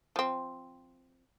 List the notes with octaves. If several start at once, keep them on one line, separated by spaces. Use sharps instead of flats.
F3 C4